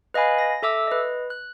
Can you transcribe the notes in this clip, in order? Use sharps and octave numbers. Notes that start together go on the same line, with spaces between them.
B4 D#5 F5 G#5 B5
A#6
A4 E5 D6 E6
B4 D#5
F#6